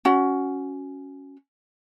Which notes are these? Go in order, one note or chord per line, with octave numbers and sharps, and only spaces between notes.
C#4 F#4 F#5